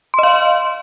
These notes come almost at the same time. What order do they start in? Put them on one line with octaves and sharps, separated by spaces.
C6 D#5 F5